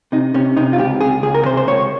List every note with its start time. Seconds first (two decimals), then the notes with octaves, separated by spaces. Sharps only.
0.12 C3 D#4
0.34 C3 C#4
0.57 C3 D#4
0.73 F4
0.78 C#2 G4
1.01 C#2 G#4
1.23 C#2 G#4
1.34 A#4
1.45 C3 C5
1.57 C5
1.67 C#2 C#5